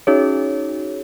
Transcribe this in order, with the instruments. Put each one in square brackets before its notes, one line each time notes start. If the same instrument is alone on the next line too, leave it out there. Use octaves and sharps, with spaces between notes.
[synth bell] C#4 D#4 F#4 G#4 C#5